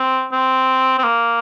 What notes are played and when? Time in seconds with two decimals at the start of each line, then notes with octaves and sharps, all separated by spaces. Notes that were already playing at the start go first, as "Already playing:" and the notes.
Already playing: C4
0.32 C4
0.98 C4
1.04 A#3